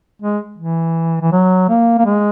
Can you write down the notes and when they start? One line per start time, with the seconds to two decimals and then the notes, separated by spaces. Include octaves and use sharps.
0.22 G#3
0.58 E3
1.21 E3
1.31 F#3
1.69 A#3
1.98 A#3
2.05 G#3